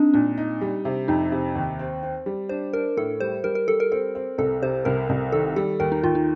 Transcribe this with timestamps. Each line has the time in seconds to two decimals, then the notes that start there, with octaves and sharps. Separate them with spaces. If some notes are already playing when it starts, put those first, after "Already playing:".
Already playing: C4 D4 D#4
0.14 A#2 D4
0.38 D#4
0.61 G3
0.85 C3
1.08 F2 D#4
1.32 C3
1.55 D#2
1.79 C4
2.03 C4
2.26 G3
2.49 D4 C5
2.73 D4 A#4
2.97 A2 A4
3.20 G3 C5
3.44 G3 A#4
3.55 A#4
3.68 G3 A4
3.80 A#4
3.92 C4 A4
4.15 C4
4.38 C2 A4
4.62 C3 C5
4.85 C2 A#4
5.09 C2
5.32 D#3 A4
5.56 G3 A4
5.80 D#2 A#4
5.92 D#4
6.03 D#2 F4
6.15 D#4